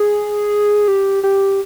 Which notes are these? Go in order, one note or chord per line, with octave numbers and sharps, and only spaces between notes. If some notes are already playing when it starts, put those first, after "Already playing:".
Already playing: G#4
G4
G4